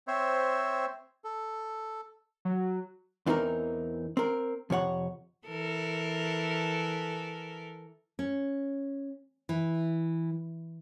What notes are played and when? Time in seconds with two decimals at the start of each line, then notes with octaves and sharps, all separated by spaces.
0.07 C4 C5 C#5 E5
1.24 A4
2.45 F#3
3.26 E2 E3 C4 D#4 A#4
4.17 C4 A#4
4.70 F2 C3 C#5 F#5
5.47 E3 A4 A#4
8.19 C#4
9.49 E3